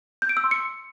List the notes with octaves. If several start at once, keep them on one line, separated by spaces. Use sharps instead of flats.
G6
D7
E6
C6
C#7